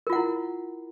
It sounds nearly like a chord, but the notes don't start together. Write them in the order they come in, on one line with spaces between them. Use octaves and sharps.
A#4 F4 F#5 E4